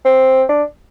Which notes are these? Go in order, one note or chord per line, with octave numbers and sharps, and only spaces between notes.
C4
D4